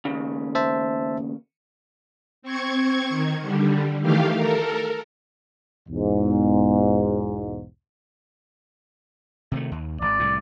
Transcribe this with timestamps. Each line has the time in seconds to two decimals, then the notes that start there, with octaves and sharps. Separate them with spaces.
0.05 D#2 A2 C#3
0.55 C5 E5 A5
2.42 C4 C#6 G#6
3.10 D#3
3.41 D3 G3
4.01 D#3 E3 A3 G4 F5
4.36 A4 A#4
5.89 B1 E2 G#2
9.52 C3 D#3 A3
9.71 D#2
10.01 G#1 D5
10.19 C2 A2